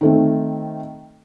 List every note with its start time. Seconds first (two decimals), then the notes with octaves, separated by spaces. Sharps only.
0.01 D#3 A3 C4